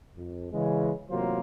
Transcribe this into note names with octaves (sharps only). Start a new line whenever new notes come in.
F2
C#3 E3 G#3
A1 C3 F#3 A#3 F4 C5